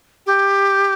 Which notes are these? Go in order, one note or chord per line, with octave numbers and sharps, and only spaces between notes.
G4